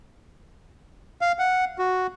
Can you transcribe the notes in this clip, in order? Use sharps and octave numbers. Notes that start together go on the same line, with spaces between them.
F5
F#5
F#4